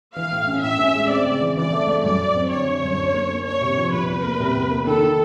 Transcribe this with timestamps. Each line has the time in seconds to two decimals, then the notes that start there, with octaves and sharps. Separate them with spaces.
0.16 E3 F5
0.32 A2
0.47 C#4
0.63 A2 E5
0.79 C#4
0.94 G#3
1.10 C4 D5
1.26 C#3
1.41 E3
1.57 E3 D5
1.73 A3
1.88 A3
2.04 F#2 D5
2.20 F#2
2.36 C4
2.51 D3 C#5
2.67 D3
2.83 F#2
2.98 D4
3.14 A#3
3.30 A#3
3.46 D4 C#5
3.61 C3
3.77 F3
3.93 C3 B4
4.08 E2
4.24 A#3
4.40 C3
4.56 E2
4.71 A#3
4.86 D#3 A4
5.03 D#3